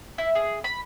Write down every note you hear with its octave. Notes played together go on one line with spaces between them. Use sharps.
E4
G#4
B5